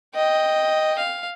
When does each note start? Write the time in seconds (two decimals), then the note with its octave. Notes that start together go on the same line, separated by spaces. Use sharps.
0.15 D#5 G5
0.98 F5